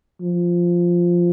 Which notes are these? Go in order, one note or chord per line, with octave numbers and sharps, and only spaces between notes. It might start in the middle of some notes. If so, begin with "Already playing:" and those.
F3